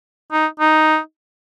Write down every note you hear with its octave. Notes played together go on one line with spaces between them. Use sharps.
D#4
D#4